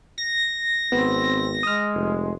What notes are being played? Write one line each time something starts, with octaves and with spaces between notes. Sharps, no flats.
A#6
G#1 B3 C4
G#3 D#6 F6
F1